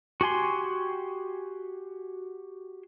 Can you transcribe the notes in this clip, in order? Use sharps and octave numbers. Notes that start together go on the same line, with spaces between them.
F#4 G4 G#5 C6